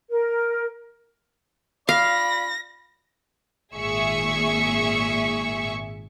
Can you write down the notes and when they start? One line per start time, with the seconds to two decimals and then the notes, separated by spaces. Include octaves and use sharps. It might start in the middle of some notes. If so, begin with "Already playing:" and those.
0.10 A#4
1.89 F4 D5 F5 B5 A#6
3.75 G#1 A#2 G#4 E5 C#6